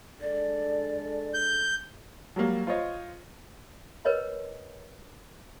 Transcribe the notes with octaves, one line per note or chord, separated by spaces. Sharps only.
G#3 D4 A4 D5
G6
F#3 G3 A#3
F4 C5 C#5 D#5
A#4 B4 C#5 D#5 B5